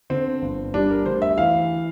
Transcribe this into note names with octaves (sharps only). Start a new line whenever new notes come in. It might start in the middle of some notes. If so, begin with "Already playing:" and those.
D3 C4
G1
G3 D4
A#4
D2 C5
E5
E3 F5